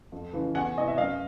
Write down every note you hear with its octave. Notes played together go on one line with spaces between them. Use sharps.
F2
C#3 E3
E2 F#5 G#5
C3 E3 D#5
E5
F#2 D#5 F5